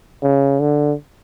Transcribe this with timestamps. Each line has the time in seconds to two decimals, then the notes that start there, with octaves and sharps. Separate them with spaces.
0.23 C#3
0.60 D3